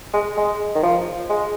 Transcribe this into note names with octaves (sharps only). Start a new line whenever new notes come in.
G#3
G#3
D#3
F3
G#3